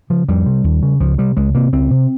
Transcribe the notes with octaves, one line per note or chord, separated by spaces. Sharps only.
C#3 F3
F2 G3
C3
D#2
C#3
C#2 F3
C3 G3
C#2 G#3
C3 A#3
C#2 C4
C3